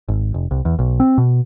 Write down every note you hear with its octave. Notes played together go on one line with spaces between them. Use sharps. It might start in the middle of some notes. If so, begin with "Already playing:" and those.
G#1
F1
C2
E2
B1
C4
B2